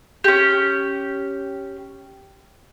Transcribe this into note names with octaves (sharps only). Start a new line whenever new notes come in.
C#4 G4